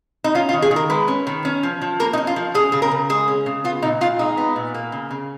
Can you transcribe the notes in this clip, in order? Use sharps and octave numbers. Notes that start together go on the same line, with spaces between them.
D#4
C#4 F4
F4
D#3
G#4
D#3
A#4
G#3 B4
C#4
D#3
C#4
F3
F3
A#3 A#4
D#4
C#4
F4
F3
C#4 G#4
C#3 G#4
A#4
C#3
G#3 G#4
C#4
C#3
B3 F4
A#2 D#4
A#2 F4
G#3 D#4
B3
A#2
A#3
C#3
C#3